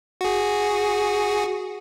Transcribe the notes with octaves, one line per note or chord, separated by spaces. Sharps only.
F#4 G#4